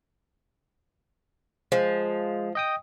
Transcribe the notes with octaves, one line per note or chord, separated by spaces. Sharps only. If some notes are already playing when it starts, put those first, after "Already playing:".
F3 G#3
D#5 G5 D#6